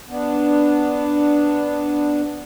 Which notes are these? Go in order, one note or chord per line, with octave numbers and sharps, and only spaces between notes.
B3 D4